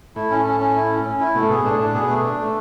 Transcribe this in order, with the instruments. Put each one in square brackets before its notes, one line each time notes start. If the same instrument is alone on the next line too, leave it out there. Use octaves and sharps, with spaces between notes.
[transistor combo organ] A2 [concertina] E4
[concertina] C#4
C#4
C#4
E4
C#4
C#4
E4
[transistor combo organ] B2 [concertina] A3
[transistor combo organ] A2
[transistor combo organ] B2 [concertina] G#4
[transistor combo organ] A2 [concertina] D4
[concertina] D4
[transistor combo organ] B2 [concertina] G#4
[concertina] A3
D4
A3